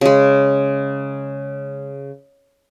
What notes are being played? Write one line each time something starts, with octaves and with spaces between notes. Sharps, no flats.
C#3 G#3